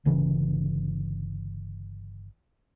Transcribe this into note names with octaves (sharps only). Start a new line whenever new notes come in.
G1 C#3 E3